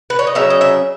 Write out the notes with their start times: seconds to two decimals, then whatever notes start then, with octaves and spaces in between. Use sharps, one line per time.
0.10 B4
0.19 C#5
0.27 D#5
0.35 C#3 F#3 C#4 E5
0.50 D#5
0.61 E5